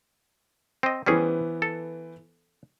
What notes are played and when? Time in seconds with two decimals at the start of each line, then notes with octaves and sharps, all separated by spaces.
0.83 C4 D#5
1.06 E3 G3 B3 C#4 G#4 C5
1.62 A4